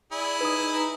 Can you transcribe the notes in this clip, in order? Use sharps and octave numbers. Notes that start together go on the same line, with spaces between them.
E4 G#4 D5
D#4 B4 D#6